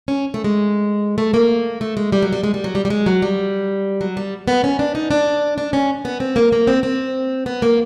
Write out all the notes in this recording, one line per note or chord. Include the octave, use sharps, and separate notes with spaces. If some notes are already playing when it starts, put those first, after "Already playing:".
C#4
A3
G#3
A3
A#3
A3
G#3
G3
F#3
G3
G#3
G3
F#3
G3
G3
G#3
F#3
G3
F#3
G3
B3
C#4
D4
D#4
D4
D4
C#4
B3
C4
A#3
A#3
C4
C4
B3
A#3